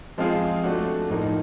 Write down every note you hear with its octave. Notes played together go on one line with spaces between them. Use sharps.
F3 G#3 C4 F4 G#4
A3 D4 F#4
A2 F3 A#3 D#4